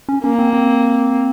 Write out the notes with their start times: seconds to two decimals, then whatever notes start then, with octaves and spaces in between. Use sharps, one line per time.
0.09 C#4
0.23 A#3 C#4
0.39 C4
0.53 C4